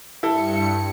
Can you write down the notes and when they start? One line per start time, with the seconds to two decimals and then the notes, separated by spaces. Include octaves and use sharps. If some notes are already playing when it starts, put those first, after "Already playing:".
0.23 G2 E4 A4 C#7